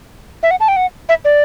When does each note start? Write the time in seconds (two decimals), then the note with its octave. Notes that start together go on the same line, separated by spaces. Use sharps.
0.43 E5
0.51 F#5
0.60 A5
0.68 G5
0.76 F#5
1.09 E5
1.25 D5